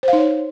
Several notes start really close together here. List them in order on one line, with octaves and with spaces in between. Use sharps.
C5 F5 D#4 C#5